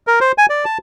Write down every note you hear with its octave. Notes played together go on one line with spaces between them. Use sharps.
A#4
C5
G#5
D5
A5